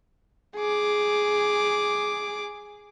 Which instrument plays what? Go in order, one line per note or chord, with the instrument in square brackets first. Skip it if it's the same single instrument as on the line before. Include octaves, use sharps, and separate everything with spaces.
[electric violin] G#4 D6